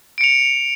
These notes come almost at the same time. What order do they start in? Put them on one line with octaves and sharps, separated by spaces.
D7 C#7 F7